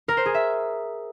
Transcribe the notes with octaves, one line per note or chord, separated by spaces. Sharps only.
A#4
C5
G#4
E5